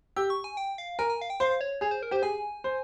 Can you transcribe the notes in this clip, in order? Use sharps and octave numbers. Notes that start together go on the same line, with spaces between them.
G4 E6
C#6
G#5
G5
F5
A#4 G#5
G#5
F5
G5
C5 F5
C#5
G#4 C#5
C5
A#4
G4 C5
G#4 G#5
C5